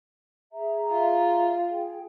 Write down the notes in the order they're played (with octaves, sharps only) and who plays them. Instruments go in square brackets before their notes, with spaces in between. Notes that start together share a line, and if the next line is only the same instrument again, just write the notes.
[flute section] G#4 E5 A#5
[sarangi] F4
[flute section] G#4 G5